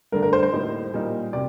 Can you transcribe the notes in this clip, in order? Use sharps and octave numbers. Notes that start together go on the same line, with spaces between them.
G2 D3 A3 D4 A#4
A#4
C5
C5
A2 G3 A#3 D#4
A#2 G3 A#3 D#4
C3 D5